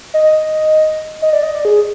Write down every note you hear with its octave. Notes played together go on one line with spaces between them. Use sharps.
D#5
D#5
D5
D#5
D5
G#4